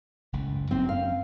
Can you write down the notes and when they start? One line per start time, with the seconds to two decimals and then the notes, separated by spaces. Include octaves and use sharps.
0.33 F#1 C#2 A2
0.71 F#2 F#3 C4
0.89 F5